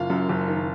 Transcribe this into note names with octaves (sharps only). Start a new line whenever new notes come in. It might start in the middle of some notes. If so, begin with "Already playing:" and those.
Already playing: F#1 F4 F5
F#2
F#1
D#3